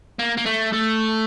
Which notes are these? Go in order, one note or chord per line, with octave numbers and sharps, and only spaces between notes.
A#3
A#3
A3
A3